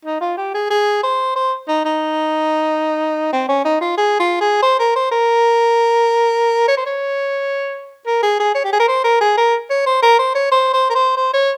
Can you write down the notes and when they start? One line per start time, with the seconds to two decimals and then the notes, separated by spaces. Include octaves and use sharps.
0.05 D#4
0.21 F4
0.37 G4
0.54 G#4
0.70 G#4
1.03 C5
1.36 C5
1.68 D#4
1.85 D#4
3.33 C4
3.49 C#4
3.65 D#4
3.81 F4
3.97 G#4
4.20 F4
4.41 G#4
4.63 C5
4.80 A#4
4.96 C5
5.12 A#4
6.68 C#5
6.77 C5
6.86 C#5
8.07 A#4
8.23 G#4
8.40 G#4
8.55 C#5
8.64 G4
8.73 G#4
8.80 A#4
8.88 C5
9.04 A#4
9.21 G#4
9.38 A#4
9.70 C#5
9.86 C5
10.02 A#4
10.19 C5
10.35 C#5
10.52 C5
10.73 C5
10.90 A#4
10.95 C5
11.17 C5
11.33 C#5